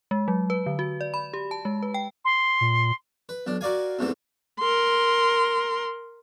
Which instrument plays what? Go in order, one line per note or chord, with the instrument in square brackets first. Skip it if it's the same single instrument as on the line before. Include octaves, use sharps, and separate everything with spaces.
[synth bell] G#3
F#3
B4
D3
F#4
D5
B5
G4
A5
G#3
B4
G5
[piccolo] C6
[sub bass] A#2
[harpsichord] B4
B1 D4
F#4 A#4 D5 F5 G#5
E2 G#2 C3 E3 A3
[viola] A#4 C6